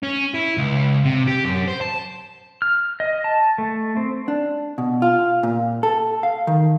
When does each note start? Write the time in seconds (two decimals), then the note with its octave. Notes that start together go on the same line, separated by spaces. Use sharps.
0.03 C#4
0.34 E4
0.58 C#2
1.05 C3
1.27 G4
1.44 F#2
1.68 C5
1.81 A5
2.62 F6
3.00 D#5
3.24 A5
3.58 A3
3.97 C4
4.28 D4
4.78 B2
5.02 F4
5.43 A#2
5.83 A4
6.23 F5
6.47 D#3